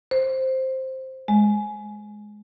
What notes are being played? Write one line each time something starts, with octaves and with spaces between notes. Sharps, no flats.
C5
G#3